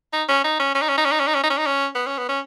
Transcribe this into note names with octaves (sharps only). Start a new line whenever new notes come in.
D#4
C#4
D#4
C#4
C#4
D#4
C#4
D#4
C#4
D#4
C#4
D#4
C#4
D#4
C#4
D#4
C#4
B3
C#4
B3
C#4